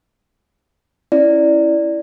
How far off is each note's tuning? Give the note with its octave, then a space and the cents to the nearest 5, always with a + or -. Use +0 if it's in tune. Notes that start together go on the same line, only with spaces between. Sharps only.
C#4 -20 E4 +0 D5 +0